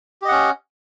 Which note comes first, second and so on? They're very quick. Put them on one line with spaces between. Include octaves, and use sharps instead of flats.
G4 D#5 F#5 C#4